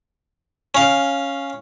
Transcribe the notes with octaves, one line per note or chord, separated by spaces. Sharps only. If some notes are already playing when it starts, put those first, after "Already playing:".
C#4 F5